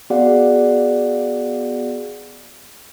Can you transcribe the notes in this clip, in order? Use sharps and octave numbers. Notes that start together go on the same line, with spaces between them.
B3 F#4 G#4 D5 F5 F#5